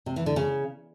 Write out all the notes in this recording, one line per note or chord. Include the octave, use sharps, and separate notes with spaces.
C3
E3
D3
C#3